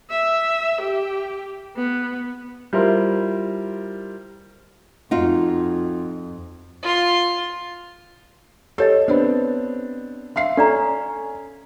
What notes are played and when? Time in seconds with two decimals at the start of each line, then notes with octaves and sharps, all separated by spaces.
0.10 E5
0.82 G4
1.77 B3
2.73 G3 E4 F4 A#4 C5
5.11 F2 D#4 F4 F#4
6.83 F4 C6
8.78 G4 A4 C#5 D#5
9.08 B3 C4 D4
10.36 E5 F5 C6 C7
10.57 C#4 A4 D5 A#5